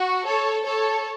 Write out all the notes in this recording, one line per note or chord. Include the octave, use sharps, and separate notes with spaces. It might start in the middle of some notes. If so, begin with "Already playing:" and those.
Already playing: F#4
A4 C#5
A4 C#5